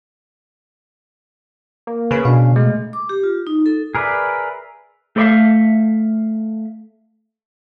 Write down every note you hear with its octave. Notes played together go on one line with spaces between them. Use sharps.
A#3
C#3 B4 B5
B2 D4 F5
G#3 A3
D6
G4
F4
D#4
A4
G#4 A#4 B4 D5 E5
A3 A4 B4 D5 E5 F5